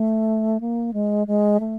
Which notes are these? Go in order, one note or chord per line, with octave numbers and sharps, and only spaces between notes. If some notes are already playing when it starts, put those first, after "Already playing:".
Already playing: A3
A#3
G#3
G#3
A3